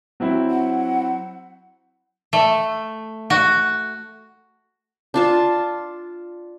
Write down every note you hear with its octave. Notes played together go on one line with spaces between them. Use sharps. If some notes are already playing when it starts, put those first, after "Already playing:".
F#3 C4 E4
F#5
A3
F#4
D4 F4 A5